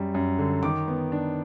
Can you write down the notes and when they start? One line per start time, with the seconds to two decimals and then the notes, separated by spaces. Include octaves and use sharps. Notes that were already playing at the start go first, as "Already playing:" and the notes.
Already playing: F#2 G3
0.14 F#2
0.39 D3
0.63 D#3 D6
0.88 B3
1.12 D4